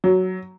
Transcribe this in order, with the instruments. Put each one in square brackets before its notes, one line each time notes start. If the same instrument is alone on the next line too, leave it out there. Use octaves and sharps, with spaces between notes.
[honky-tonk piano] F#3